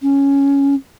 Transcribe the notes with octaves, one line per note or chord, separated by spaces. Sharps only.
C#4